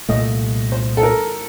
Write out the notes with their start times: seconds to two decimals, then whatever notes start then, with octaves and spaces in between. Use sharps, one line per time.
0.09 C2 A#2 A3 D#5
0.72 C5
0.97 A4
1.03 A#4